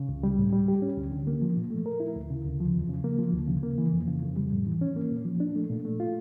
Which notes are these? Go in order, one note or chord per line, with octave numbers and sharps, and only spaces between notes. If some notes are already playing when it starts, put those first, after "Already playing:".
Already playing: C#3
C#2
G3
A2
G3
G4
C#4
D2
D3
A#3
F3
A#2
A3
A#4
E4
D2
C#3
D2
F3
E2
C#3
A#3
F3
D2
C#3
A#3
E3
F2
C#3
F2
G3
A2
E3
C#4
A#3
A#2
F3
D4
A3
A#2
A3
F4